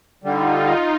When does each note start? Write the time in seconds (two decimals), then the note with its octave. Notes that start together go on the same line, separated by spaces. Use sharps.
0.24 D3 G3 D#4 F4